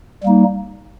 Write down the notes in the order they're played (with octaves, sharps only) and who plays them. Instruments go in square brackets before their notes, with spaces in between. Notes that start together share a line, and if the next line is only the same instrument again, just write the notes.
[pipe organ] G3 A#3 D#4